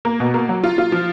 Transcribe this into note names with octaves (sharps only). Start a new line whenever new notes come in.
A#3
B2
A#3
F#3
F4
F4
F3